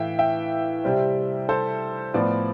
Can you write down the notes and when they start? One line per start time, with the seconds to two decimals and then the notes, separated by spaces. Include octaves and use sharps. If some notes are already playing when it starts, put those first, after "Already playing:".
Already playing: A2 E3 A3 E5 F5 G5
0.19 E5 G5
0.84 C3 G3 C4
1.49 A4 C5
2.14 A2 F3 B3 B4 D5